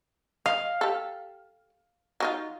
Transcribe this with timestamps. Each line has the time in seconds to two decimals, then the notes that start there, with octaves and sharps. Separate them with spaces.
0.46 D#5 F5
0.81 G4 A4
2.20 F#3 D#4 F4